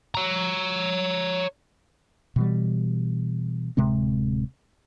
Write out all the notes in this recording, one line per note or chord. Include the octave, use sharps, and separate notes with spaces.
C#5 A#5
B2 E3 G3
D1 C3 G#3 C4